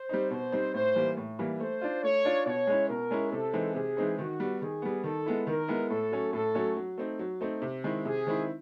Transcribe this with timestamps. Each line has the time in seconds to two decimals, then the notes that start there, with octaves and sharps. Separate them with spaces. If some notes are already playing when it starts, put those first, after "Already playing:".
Already playing: C5
0.09 G3 C4 D#4
0.31 B2 C5
0.52 G3 C4 D#4
0.74 A2 C5
0.96 E3 G3 A#3
1.17 A2
1.39 E3 G3 A#3
1.60 A3 C5
1.82 D4 F4
2.03 A3 C#5
2.25 D4 F4
2.46 B2 C#5
2.67 G#3 C#4 E4
2.89 B2 A#4
3.11 G#3 C#4 E4
3.32 C3 A4
3.53 E3 G#3 C4 D#4
3.75 C3 G#4
3.97 E3 G#3 C4 D#4
4.18 D#3 F#4
4.40 G3 B3
4.61 D#3 G#4
4.82 G3 B3
5.04 D#3 A4
5.26 G#3 B3 E4
5.47 D#3 A#4
5.68 G#3 B3 E4
5.90 A2 A4
6.12 F#3 A3 C#4
6.33 A2 A4
6.55 F#3 A3 C#4
6.77 F#3
6.98 A3 C4 D#4
7.19 F#3
7.41 A3 C4 D#4
7.62 C3
7.84 D#3 G#3 C4 E4
8.05 C3 G#4
8.27 D#3 G#3 C4 E4